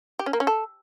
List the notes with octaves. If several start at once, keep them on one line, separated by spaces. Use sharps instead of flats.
G4
C#4
A#3
C#4
A4